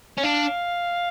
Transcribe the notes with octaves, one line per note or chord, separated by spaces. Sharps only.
C#4
D4 F5